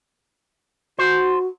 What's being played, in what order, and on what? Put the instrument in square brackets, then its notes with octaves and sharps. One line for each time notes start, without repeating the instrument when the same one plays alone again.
[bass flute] F#4 [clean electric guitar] C5